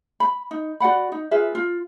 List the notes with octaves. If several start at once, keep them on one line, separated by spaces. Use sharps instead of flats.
B5
D#4
F#4 D5 F#5 B5
D#4
F4 G#4 B4 E5
F4